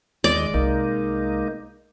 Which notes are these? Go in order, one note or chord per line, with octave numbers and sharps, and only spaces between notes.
D#2 G#3 D5 D#5
C2 A#3 D#4